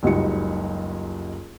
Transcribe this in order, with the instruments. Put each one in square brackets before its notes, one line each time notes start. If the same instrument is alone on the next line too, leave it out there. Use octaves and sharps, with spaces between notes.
[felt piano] F#1 C#2 F#3 G3 D#4 C#7